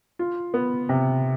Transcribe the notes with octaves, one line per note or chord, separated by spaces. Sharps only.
F4
B3
C3